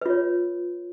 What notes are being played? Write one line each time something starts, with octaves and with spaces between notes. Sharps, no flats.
F4 B4 C#5